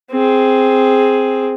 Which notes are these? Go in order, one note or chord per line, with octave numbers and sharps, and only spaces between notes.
C4 G#4